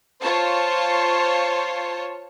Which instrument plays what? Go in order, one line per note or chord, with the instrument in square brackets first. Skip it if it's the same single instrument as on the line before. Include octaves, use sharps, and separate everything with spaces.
[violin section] F4 C5 C#5 A5